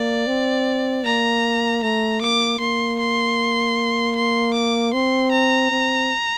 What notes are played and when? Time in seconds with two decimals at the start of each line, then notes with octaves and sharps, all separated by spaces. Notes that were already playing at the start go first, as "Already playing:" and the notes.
Already playing: A#3 D5
0.27 C4
1.05 A#3 A#5
1.83 A3 A#5
2.22 A#3 D6
2.60 A#3 C6
3.00 C6
4.16 C6
4.54 D6
4.94 C4 C6
5.32 A#5
5.71 C4